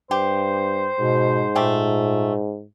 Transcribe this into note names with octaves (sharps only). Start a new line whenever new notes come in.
G2 G4 C5
G#2 B2
A#2 A3 G4